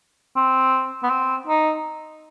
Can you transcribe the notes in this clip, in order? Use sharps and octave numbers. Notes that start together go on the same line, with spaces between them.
C4
B3
C4
D#4